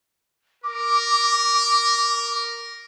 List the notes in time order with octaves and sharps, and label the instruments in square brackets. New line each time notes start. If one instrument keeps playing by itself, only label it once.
[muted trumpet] A#4 [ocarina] D6